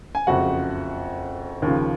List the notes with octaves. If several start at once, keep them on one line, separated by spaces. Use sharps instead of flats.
G#5
F#1 F2 C#3 F3 F#4 F#5
D#2 C#3 F3